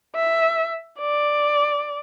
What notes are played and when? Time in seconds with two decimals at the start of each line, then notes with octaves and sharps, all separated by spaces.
0.15 E5
1.00 D5